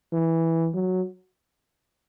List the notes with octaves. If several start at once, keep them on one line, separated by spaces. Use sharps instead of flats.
E3
F#3